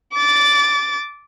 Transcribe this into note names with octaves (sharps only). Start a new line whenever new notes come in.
D6 A6